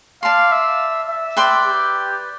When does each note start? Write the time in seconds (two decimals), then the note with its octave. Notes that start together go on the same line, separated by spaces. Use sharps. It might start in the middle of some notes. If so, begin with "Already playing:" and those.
0.23 D5 F5 A5 C6
0.52 E5
1.09 E5
1.37 B4 D5 G5 C6
1.66 G4